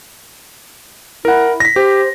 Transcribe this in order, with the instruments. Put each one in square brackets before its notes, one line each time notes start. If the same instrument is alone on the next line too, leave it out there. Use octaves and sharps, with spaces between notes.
[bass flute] E4 [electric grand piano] A#4 F#5
[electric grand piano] A#6 B6
[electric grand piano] G4 [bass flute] C5